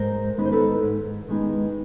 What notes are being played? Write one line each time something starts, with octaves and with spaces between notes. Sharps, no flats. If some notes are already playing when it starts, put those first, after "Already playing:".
Already playing: G#2 A#4 C5
D#3 G#3 B3 D#4 B4
C5
A4 B4
G#2
D#3 G#3 B3 D#4